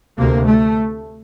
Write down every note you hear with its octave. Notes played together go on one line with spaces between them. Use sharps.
D2 C3 A#3
A3